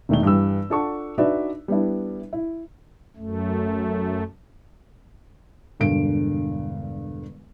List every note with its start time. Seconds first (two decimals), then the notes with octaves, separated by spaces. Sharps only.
0.09 E1 D#3 A3 D#4 G7
0.23 G2 E3 G3 E6
0.70 D4 F4 A4 F#5 C#6
1.18 D4 D#4 F#4 B4 D5 E5
1.68 G3 B3 D4 E4
2.33 E4
3.17 F#2 A3
5.80 E1 G2 D3 D7